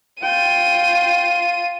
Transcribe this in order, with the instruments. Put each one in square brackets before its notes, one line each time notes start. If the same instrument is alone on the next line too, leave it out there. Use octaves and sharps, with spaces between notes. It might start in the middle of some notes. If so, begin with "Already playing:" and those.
[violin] F4 D#7 [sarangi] G5